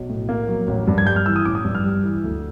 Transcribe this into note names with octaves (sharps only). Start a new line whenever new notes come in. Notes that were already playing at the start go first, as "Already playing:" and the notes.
Already playing: B1
A2
A#3
F#3
A1
G2
G#6
G3 G6
F6
E3 E6
D#6
A1 D6
D#6
G2
F6
G3
E3
D2